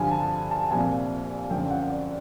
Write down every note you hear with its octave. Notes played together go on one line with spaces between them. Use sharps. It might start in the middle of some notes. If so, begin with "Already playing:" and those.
Already playing: G2 D3 F3 G#5
A5
A5
C2 A#2 F3 G#5
F#2 D3 F3 G5
F#5
D5